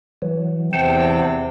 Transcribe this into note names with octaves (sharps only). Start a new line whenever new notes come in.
E3 F#3
E2 C3 C5 F#5 G5 A5